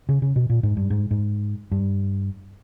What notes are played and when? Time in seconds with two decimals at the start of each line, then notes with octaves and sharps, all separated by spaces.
0.09 C#3
0.22 C#3
0.36 B2
0.50 A#2
0.63 G#2
0.77 G2
0.90 G#2
1.11 G#2
1.72 G2